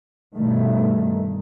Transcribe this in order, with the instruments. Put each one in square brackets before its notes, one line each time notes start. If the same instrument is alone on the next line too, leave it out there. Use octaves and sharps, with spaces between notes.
[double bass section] G2 B2 D#3 A3